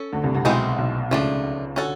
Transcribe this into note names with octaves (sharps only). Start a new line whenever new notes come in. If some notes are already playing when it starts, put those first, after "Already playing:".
Already playing: C#4 A4
D2 D3
C2 C3
C2 C3
B1 B2 E3 G#3 C4 D#4
B1 B2
C#2 C#3 F3 A3 D4
D3 C#4 F#4 A4